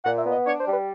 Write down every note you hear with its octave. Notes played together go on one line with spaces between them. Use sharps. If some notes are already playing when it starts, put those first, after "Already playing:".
A#2 F#5
E5
B3
D#5
D4 C#5
C5
G3
B4